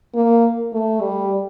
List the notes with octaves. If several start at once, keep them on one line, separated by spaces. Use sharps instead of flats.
A#3
A3
G3